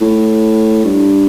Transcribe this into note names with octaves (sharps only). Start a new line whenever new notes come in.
A2
G2